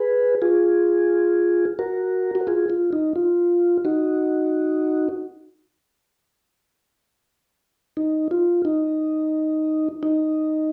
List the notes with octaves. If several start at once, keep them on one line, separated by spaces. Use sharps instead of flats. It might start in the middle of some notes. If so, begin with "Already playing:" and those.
Already playing: G#4 B4
F4 G#4
F#4 A#4
F#4
F4 G#4
F4
D#4
F4
D#4 F#4
D#4
F4
D#4
D#4